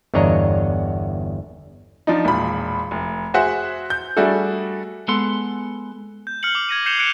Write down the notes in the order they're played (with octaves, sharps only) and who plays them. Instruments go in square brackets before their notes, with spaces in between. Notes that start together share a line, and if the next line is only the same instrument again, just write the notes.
[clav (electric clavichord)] G1 E2 D4 C#5 D#5 A#5
[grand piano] F3 D4 D#4
E1 A#2 B5
F1
F#4 G#4 C5 E5 F#5 G#5
G6
G3 A3 D4 F#4 G#4 A4
[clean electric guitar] G#3 B3 A4 F#5 C6
[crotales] G6
F6 C7 C#7 F#7
D6
G#6 A#6 D#7
G6 C7 C#7 E7 F7 G7
F#6 C#7 D7 F7